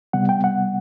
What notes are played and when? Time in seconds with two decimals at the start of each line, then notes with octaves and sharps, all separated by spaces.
0.13 C3 G3 B3 F#5
0.29 G5
0.44 F#5